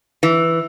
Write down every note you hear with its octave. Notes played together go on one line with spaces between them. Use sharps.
E3